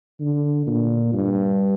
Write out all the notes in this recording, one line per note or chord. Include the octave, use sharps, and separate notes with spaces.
D3
A#2
G2